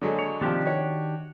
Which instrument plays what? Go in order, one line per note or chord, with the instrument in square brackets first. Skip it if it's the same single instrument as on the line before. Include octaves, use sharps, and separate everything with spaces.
[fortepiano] D3 F#3 G#3
[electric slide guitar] C#5
[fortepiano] C3 F3 [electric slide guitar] D#3 D4 G4
[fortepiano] F#4 C#5